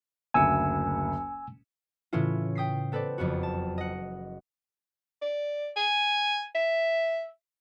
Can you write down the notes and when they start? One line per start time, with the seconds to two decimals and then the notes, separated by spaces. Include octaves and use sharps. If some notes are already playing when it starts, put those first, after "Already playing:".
0.34 F#1 D2 G#5 E6 C#7
2.13 A2 C#3 E3 C#4 E4 F4
2.55 G5 D#6 B6 C7
2.92 B3 A4 B4 C5 D5
3.18 F#1 F2 B3 F#4
3.43 A5
3.78 D#5 F#5
5.22 D5
5.77 G#5
6.55 E5